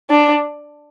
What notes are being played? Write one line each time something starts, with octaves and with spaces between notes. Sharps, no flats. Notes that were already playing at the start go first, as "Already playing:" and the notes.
D4